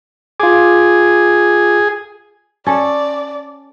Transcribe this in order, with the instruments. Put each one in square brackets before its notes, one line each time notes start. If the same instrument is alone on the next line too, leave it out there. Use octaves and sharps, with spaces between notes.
[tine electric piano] F4 D6 [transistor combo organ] G#4
[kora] C#4 A4 [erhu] D5